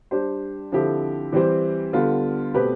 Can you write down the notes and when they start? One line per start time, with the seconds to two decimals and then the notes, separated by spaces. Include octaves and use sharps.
0.11 G3 D4 G4 C5
0.72 D3 F3 C4 E4 G4
1.32 E3 G3 C4 G4 C5
1.93 D3 G3 B3 F4
2.54 B2 A3 C4 G4 B4